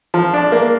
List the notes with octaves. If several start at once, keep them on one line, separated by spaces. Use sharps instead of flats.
F3
D4
A#3